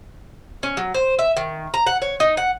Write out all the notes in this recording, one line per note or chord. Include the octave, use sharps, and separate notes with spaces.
C#4
F#3
C5
E5
D#3
A#5
F#5
C#5
D#4
F#5